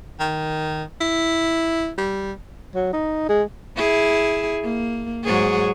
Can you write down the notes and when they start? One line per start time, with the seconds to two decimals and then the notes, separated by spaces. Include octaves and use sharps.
0.19 D#3
1.01 E4
1.98 G3
2.75 F#3
2.93 D#4
3.29 G#3
3.77 E4 G#4
4.63 A#3
5.24 G#2 F#3 G#4